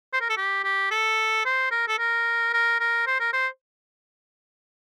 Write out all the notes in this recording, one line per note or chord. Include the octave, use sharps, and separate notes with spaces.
C5
A#4
A4
G4
G4
A4
C5
A#4
A4
A#4
A#4
A#4
C5
A#4
C5